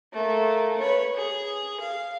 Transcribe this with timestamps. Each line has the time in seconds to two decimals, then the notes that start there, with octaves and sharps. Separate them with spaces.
0.13 A3 A#3
0.78 B4 C#5
1.15 G#4
1.80 F5